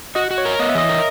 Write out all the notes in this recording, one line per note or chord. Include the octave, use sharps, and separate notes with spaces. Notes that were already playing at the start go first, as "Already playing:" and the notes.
F#4 D#5
F#4
C#5
A#4
B3 D#5
E5
E3 D#5
A#4